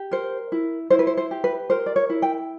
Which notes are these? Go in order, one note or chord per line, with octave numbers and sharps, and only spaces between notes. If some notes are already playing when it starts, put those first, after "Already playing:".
Already playing: G4
A#4 C5
E4
E4 C5
B4
C5
C5
G4
B4
A#4 C5
D5
C#5
E4
G5